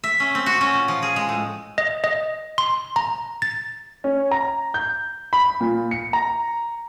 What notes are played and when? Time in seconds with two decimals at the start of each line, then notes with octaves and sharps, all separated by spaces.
0.04 E5
0.20 C#4
0.35 C4
0.46 F#4
0.61 C#4
0.73 A#2
0.88 F3
1.03 G#4
1.16 G#3
1.29 A2
1.78 D#5
2.04 D#5
2.58 C6
2.96 A#5
3.42 A6
4.04 C#4
4.31 A#5
4.74 G6
5.33 B5
5.61 A#2
5.91 C#7
6.13 A#5